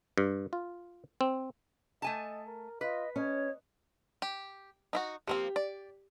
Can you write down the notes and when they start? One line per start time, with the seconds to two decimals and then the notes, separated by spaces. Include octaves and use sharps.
0.18 G2
0.53 F4
1.21 C4
2.02 A3 D#5 G#5 A5
2.47 A#4
2.81 F4 B4 D#5
3.16 C#4 C#5 D#5
4.22 G4
4.93 D#4 E4 F#4
5.27 F3 A#3 C4 G4
5.56 D5